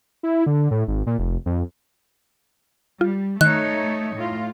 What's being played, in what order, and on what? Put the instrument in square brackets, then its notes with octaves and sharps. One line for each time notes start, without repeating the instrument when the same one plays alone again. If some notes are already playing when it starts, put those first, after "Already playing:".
[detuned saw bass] E4
D3
A2
G#1
A#2
F1
F2
[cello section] G3 [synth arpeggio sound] F4
[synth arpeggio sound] D#3 [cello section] A3 D#4 C#5 [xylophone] F#6
[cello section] A2 F4